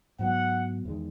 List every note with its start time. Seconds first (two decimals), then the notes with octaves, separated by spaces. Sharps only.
0.19 G#2 F#3 B3 F#5
0.85 E2 D#3 G#3